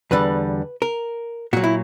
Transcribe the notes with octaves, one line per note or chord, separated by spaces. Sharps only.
E2 D3 G3 B4
A#4
A#2 F#3 F#4
E4